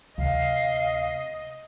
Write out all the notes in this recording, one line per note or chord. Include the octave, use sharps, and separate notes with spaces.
D2 C3 D#5 F5